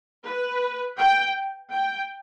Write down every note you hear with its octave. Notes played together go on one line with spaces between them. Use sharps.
B4
G5
G5